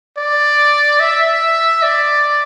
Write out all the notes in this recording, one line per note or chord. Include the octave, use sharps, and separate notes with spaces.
D5
E5
D5